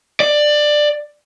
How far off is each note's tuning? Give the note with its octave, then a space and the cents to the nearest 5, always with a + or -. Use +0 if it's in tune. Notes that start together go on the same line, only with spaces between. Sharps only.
D5 +15